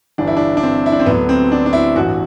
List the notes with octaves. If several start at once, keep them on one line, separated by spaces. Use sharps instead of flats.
G1 G2 E3 D4
E4
D4
D4
C4
E4
D4
C4
D2 D3 F#3 B3
C4
D4
D4
E4
A1 G2 E3 F#4